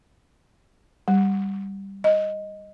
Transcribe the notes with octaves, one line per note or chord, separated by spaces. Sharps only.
G3
D#5